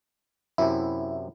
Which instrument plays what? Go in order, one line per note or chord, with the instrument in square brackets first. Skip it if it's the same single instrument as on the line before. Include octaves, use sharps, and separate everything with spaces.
[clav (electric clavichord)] F#2 C3 [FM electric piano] E4